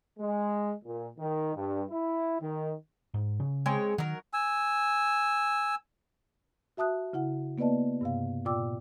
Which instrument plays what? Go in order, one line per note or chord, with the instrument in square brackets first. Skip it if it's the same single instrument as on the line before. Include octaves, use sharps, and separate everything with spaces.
[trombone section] G#3
A#2
D#3
G2
E4
D#3
[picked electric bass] G#2
C#3
[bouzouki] G#3 C4 C#5
[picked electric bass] D#3 [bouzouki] F#3 A#4
[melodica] G#5 E6
[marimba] F#4 E5 A5 D#6 F#6
C#3 E4 F#5
A#3 B3 B4 D5 D#5 A5
G2 C3 F5
A#2 F4 D5 G5 D6 E6